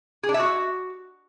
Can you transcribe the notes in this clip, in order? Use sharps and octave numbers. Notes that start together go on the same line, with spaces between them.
G#4
D4
E5
F#4